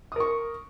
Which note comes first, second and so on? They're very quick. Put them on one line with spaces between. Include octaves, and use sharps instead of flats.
D#6 A#4 C#6